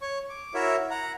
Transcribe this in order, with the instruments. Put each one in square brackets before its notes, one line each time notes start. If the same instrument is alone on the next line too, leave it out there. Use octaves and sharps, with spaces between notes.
[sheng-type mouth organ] C#5 C#6
D6
E4 F#4 A#4 C#5 E5
F#5 A#5